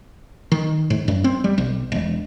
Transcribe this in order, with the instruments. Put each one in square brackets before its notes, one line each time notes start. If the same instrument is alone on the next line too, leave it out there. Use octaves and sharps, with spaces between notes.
[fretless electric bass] D#3
G#2
F#2
C4
G3
B1
E1